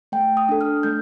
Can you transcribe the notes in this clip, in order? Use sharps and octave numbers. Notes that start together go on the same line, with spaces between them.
A3 G5
D#6
D4 A4
F6
A3 G6